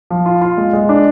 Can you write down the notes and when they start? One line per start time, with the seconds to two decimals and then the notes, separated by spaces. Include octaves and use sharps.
0.10 F3
0.26 F4
0.41 F4
0.57 G#3
0.73 G#3
0.89 D4